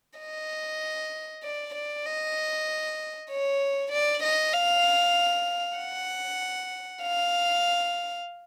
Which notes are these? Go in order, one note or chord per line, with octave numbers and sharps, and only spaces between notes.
D#5
D5
D5
D#5
C#5
D5
D#5
F5
F#5
F5